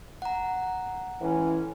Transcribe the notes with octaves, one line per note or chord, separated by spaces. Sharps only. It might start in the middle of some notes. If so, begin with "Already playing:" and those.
F#5 A#5
A2 E3 G#3 C#4